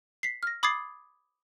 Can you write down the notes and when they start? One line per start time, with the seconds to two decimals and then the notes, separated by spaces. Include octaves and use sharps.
0.23 B6 C7
0.43 F6 A#6
0.63 B5 D6 D#6 G#6 A6 C7